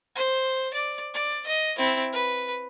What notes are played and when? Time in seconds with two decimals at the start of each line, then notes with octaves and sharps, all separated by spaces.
0.16 C5
0.74 D5
1.14 D5
1.47 D#5
1.78 C4 E4
2.13 B4